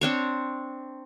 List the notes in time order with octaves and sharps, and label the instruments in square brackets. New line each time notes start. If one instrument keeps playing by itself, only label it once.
[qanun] C4 D4 C#5